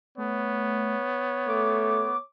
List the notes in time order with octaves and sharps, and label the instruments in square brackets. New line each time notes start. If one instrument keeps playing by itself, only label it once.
[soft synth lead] A3 [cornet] B3 [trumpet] C#5
[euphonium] A3 [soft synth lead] D6